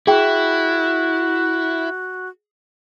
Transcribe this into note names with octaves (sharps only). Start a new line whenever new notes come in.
E4 F#4 G#4 G5